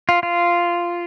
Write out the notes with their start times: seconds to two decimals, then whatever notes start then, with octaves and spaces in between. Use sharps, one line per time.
0.09 F4
0.23 F4